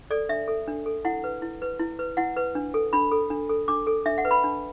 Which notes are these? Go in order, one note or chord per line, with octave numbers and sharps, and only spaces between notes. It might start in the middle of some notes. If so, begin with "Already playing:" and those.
A4 D5
D4 E5
A4
D4
A4
E4 F#5
B4
E4
B4
E4
B4
E4 F#5
B4
D4
A4
D4 B5
A4
D4
A4
D4 D6
A4
D4 E5
F#5
B4
B5
D4